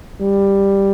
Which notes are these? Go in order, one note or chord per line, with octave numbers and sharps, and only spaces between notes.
G3